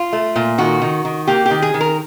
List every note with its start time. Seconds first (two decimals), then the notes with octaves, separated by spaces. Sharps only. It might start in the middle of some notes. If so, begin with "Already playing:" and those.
Already playing: F4
0.13 A3
0.36 A#2
0.58 D#3 F#4
0.82 D#3
1.05 D#3
1.27 A#3 G4
1.46 D#3 G4
1.62 G#4
1.74 D#3
1.80 A#4